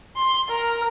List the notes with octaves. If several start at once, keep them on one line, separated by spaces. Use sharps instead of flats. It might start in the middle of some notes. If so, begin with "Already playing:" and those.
C6
A#4